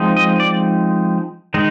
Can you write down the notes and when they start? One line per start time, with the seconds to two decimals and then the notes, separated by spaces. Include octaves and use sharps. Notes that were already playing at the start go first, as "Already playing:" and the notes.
Already playing: F3 G#3 C4 D#4
0.16 D#5
0.40 D5
1.54 D#3 G#3 D#4